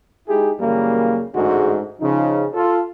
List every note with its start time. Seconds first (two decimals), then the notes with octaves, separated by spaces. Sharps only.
0.28 G#3 D#4 E4 G4 G#4
0.60 F#2 C#3 E3 G3 A#3
1.35 A1 G#2 D3 G#3 A3 F#4
2.01 C#3 F3 D#4
2.54 F4 A4